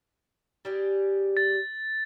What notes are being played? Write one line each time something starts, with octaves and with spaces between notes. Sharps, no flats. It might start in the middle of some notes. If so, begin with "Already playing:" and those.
G3 G4 G#4
A6